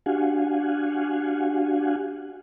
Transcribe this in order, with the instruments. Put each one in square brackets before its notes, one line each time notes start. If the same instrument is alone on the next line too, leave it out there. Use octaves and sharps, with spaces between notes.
[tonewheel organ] D4 F#4 G4 F5 F#5 G#5